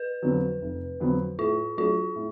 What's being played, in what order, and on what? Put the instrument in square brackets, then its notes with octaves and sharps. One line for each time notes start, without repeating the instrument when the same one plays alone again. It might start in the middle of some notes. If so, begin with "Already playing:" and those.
Already playing: [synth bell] B4
[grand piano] F2 D3 F#3 B3
F1
F2 D3 F#3 B3
[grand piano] A2 [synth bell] F4
[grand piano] F#3 A3 D4 F#4 [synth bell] F4
[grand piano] A2